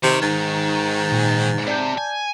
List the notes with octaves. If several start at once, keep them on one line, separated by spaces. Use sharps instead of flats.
C3 D#3
G#2
A#2 G#5
C3 D5 A5 G6
G#5